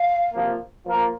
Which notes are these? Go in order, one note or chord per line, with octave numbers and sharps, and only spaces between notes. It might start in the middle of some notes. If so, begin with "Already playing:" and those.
Already playing: F5
C3 F3 A#3
F3 A#3 F4 A#4